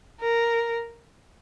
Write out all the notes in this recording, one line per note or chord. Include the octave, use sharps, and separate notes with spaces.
A#4